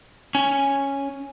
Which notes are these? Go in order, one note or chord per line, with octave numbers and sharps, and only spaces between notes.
C#4 G#5